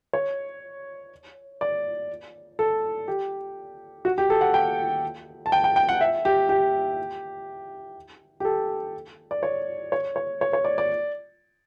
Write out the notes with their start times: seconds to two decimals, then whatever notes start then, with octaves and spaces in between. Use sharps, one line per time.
0.13 C#5
1.61 D5
2.59 A4
3.08 G4
4.05 F#4
4.18 G4
4.30 A4
4.41 F#5
4.54 G5
5.46 A5
5.52 G5
5.64 G5
5.76 G5
5.89 F#5
6.01 E5
6.25 G4
6.49 G4
8.40 G4
8.45 A4
9.31 D5
9.43 C#5
9.92 C#5
10.16 C#5
10.41 C#5
10.53 C#5
10.65 D5
10.78 D5